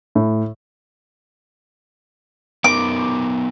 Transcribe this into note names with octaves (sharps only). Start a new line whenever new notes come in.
A2
B3 D#4 A#4 D6